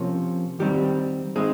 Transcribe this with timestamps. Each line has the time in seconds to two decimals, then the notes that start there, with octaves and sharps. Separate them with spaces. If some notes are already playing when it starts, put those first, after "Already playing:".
Already playing: C3 F3 A#3 C#4
0.60 D#3 G3 C4 G4
1.36 G#3 C4 D#4 G#4